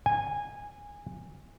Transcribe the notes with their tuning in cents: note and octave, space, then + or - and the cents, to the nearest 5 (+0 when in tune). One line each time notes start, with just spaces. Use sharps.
G#5 -15